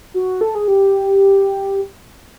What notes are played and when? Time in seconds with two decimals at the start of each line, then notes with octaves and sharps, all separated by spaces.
0.14 F#4
0.41 A4
0.55 G#4
0.68 G4